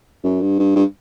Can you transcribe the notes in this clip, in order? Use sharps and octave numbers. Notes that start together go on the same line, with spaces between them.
F#2
G2
G2
G2